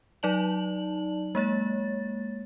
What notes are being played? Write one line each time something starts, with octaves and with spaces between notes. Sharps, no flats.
F#3 D#4 D5 A5 F#7
G#3 A#3 C#5 A6